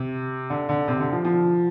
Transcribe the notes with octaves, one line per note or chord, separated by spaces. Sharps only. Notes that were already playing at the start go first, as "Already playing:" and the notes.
Already playing: C3
D3
D3
C3
D3
F3
F3